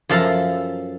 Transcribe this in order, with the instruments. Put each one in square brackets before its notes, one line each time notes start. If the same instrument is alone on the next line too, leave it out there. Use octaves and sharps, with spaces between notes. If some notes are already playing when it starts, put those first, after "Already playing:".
[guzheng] F#2 F3 A4 E5 F5 A#5